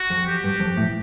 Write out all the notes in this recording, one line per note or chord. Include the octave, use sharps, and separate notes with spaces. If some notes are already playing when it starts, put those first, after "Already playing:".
Already playing: F#4
F2
G4
G2
F2
A2